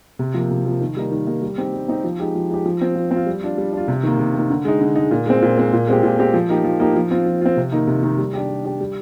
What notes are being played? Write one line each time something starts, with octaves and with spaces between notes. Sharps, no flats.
C3
F3 A#3
C3
F3 A#3
D#3
G3 A#3 D#4
D#3
G3 A#3 D#4
G3
C4 D#4 G4
G3
C4 D#4 G4
F3
G#3 D#4 G4
F3
G#3 D#4 G4
F3
C4 F4
F3
C4 F4
G3
D4 F4
G3
D4 F4
C3
D#3 A#3
C3
D#3 A#3
D3
G#3 D#4
D3
G#3 D#4
A#2
G#3 C4
A#2
G#3 C4
A#2
G#3 C4 G4
A#2
G#3 C4 G4
F3
A#3 D#4 G4
F3
A#3 D#4 G4
F3
C4 F4
F3
C4 F4
C3
D#3 A#3 D#4
C3
D#3 A#3 D#4
G3
D4 G4
G3
D4 G4
G3